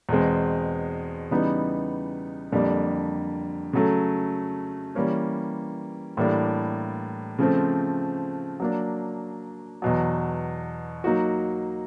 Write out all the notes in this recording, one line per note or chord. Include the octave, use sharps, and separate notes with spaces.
E2 B2 G#3 C4
C#3 E3 G3 B3 D#4
F2 D3 G3 A#3 D4
C#3 F#3 A3
E3 G3 A#3 C#4
A2 E3 G3 A#3 D4
C#3 F3 A3 C4
F#3 A#3 D4
E2 B2 F#3
F#3 A#3 D#4 F#4